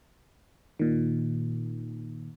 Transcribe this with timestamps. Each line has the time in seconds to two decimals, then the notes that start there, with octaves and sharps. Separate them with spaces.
0.79 A#2 D#3